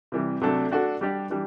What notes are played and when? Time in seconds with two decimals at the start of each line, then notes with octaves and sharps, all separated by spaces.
0.12 C3 E3 G3
0.41 C3 F#3 A3 D4 A4
0.71 A3 D4 F#4 A4
1.01 G3 D4 G4 D5
1.30 E3 G3 D4 G4